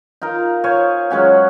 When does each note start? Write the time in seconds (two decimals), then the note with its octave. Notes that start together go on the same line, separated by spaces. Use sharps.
0.22 D#4 F4 A#4
0.64 C5 C#5 F5 G#5
1.10 F#3 G#3 C#4 F#4